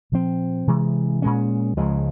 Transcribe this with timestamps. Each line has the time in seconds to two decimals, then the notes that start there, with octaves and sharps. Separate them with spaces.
0.12 A#2 F3 C4
0.67 C3 E3 G#3
1.22 A#2 G#3 C#4
1.77 C#2 C#3 F3 G#3